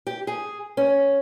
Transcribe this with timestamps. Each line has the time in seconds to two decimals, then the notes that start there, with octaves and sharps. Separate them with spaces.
0.07 G4
0.27 G#4
0.77 C#4